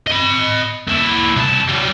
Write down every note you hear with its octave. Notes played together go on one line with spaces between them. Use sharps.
D#5 B5
A#2 E4
C2 A5
F#3 G3